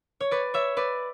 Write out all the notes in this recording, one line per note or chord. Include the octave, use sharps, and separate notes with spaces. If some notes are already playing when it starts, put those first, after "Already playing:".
C#5
B4 D5
C#5 E5
B4 D5